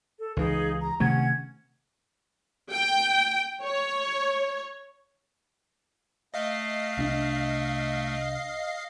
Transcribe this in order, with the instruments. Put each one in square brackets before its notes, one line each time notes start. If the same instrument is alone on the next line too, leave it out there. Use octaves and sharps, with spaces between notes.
[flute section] A4
[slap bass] C#2 E3 [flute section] D#4 G#4 F5
[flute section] A#5
[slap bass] C3 D#3 A3 [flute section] C#4 F#5 G#6
[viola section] G5
C#5
[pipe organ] A3 [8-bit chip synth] D#5 F5 C7
[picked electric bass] C2 C4 D4